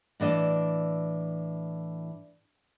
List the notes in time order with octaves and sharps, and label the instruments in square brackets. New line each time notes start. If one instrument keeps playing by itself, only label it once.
[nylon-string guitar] A2 E3 D4 D#5